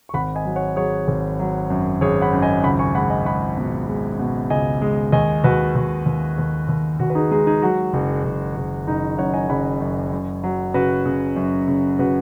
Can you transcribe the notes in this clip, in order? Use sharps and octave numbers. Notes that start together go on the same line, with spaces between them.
C#6
G#1 F#5 B5
D#5 G#5
F#3
C#5 F#5
F#3 G#4 C#5
G#1
F#3
F#2
G#1 G#4 C#5
F#5 B5
F#2
D#5 G#5
C#2 F#5 B5
G#5 C#6
G#3 F#5 B5
D#5 G#5
G#3 F#5 B5
B2
G#3
B2
C#2 D#5 G#5
G#3
D#2 D#5 G#5
D#2 F#4 B4
D#2 F#4
D#2
D#2
D#2
D#2 F#4
B4
D#4 G#4
G#3 D#4 G#4
D#4 G#4
F#3 F#4
F#1
F#1
F#1
F#1 D#4
F#2 C#5 F#5
D#5 G#5
F#1 F#5 B5
F#2
F#2
F#3
C#3 F#4 B4
C#3
F#2
C#3
C#3 F#4 B4